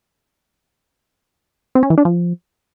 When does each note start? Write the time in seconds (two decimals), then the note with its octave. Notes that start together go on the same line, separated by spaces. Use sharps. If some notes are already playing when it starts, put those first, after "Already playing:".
1.75 C4
1.83 C#4
1.90 E3
1.98 D4
2.05 F3